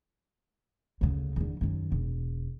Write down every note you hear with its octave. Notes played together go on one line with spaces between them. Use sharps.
D2 C#3
E2 D3
F#2 D#3
E1